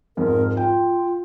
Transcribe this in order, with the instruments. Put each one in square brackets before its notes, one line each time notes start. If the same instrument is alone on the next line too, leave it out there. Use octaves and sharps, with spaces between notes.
[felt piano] F2 G#2 [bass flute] A#4
[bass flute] F4 [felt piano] G5